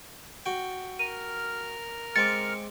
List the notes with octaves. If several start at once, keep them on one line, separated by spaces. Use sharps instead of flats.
F#4 G5
A#4 F6 D#7
G#3 C4 D6 A6 C#7